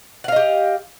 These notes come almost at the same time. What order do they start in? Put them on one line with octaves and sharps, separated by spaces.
F#5 F5 D#5 G4